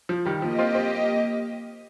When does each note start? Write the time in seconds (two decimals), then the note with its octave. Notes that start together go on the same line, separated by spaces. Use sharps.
0.09 F3
0.25 D#3 G3
0.42 F3 A#3 G4 D#5
0.58 C4 F4
0.75 C4 F4